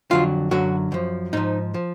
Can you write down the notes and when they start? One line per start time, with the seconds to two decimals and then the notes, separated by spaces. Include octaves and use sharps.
0.11 F2 D3 F#3 F4
0.51 F#2 D3 F#3 F#4
0.92 F#2 F3
1.33 G#2 F3 D#4
1.74 F3